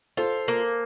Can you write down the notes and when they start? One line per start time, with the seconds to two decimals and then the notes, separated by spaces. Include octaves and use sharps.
0.17 F4 A4 C5
0.48 A#3